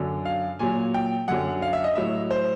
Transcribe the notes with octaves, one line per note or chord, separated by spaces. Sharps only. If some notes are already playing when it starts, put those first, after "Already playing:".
Already playing: F#2 D3 F#3
F5
A#2 F#3 G#5
G5
F#2 D3 F#3 F#5
F5
E5
D#5
A2 F#3 E5
C5